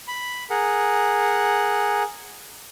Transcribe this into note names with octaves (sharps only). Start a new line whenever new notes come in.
B5
G#4 A#4 F#5